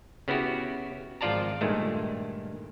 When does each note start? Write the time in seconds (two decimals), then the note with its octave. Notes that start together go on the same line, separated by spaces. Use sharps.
0.28 C#3 B3 E4 F#4 G4
1.21 G#1 F3 F4 D5 A5 A#5
1.61 G2 A#2 D#3 G#3 A3